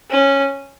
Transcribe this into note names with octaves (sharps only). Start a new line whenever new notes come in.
C#4